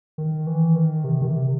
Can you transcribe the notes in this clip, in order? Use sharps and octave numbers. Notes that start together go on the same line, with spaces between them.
D#3
E3
D#3
C3
D#3
C3